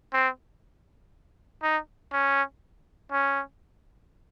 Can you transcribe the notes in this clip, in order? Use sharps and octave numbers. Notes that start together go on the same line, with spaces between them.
C4
D#4
C#4
C#4